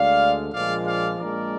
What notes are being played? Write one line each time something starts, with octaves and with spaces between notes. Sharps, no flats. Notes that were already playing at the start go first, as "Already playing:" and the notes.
Already playing: D2 D3 G#3 D5 F5
A#1 A#2 F3 G#3 D5 F5
D5 F5
A#1 A#2 G#3 D4 A#4 D5